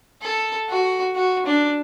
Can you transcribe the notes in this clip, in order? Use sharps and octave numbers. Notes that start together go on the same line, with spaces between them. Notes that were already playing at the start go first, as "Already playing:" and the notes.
A4
F#4
F#4
D4